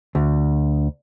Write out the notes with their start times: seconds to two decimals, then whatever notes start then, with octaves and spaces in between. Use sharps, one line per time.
0.15 D2